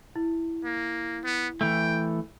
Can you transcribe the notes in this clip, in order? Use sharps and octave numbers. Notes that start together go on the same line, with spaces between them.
E4
A#3
B3
E3 A3 G5